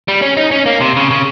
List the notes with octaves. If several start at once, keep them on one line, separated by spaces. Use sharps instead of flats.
G3
C#4
D#4
C#4
A#3
C3
C#3
C#3